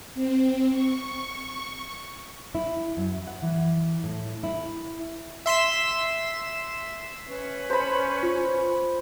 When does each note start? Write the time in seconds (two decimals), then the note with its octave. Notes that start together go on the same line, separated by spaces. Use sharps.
0.15 C4
0.71 C#6
2.55 E4
2.97 F#2
3.27 F#5
3.42 E3
4.04 A2
4.43 E4
5.46 E5 C6 B6 E7
7.27 C#4 B4 C#6
7.70 C5 B5
8.23 F4